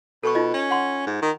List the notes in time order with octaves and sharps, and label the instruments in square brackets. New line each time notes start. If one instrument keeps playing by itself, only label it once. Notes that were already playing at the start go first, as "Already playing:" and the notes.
[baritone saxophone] B2 [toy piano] A4 C#6
[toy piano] D#4 F4 D#5
[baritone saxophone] C#4
[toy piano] F#5 C6
[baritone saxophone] G#2
D#3